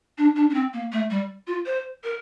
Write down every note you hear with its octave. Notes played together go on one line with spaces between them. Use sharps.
D4
D4
D4
C4
A#3
A3
G3
F4
C5
A#4